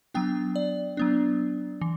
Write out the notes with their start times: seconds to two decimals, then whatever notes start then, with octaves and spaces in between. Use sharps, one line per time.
0.14 F#3 B3 D4 G5
0.56 D5
0.97 F#3 B3 D4
1.81 E3